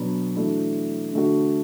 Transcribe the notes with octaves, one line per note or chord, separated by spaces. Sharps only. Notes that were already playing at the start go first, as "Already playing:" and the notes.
Already playing: B2 F#3 B3 D4 F#4
E3 A3 D4 F#4
D3 A3 D4 F#4